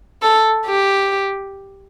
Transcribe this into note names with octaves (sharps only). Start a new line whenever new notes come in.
A4
G4